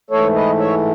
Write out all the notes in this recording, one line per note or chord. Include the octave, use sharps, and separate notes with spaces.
G#2 E3 A3 A4 C#5
B4 D#5
C#5 E5